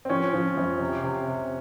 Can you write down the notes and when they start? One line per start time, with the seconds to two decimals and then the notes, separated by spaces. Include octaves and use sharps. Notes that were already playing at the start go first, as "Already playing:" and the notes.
0.05 C4
0.09 F3 C#4
0.34 F3
0.57 F2
0.81 C3
1.04 C3
1.28 C3